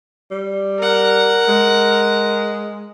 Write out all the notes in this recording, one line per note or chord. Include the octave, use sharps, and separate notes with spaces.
G3
A#4 F#5
G#3